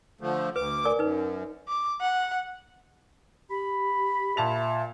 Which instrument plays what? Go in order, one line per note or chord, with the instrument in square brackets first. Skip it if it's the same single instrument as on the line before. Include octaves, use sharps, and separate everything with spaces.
[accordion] D3 F3 A3
[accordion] D2 D6 [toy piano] B4
[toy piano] A#4 D5 G#5
[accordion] F#2 [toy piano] D#4 B4
[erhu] D6
F#5
[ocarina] G4 [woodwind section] B5
[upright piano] A#2 A5 F7 [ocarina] E5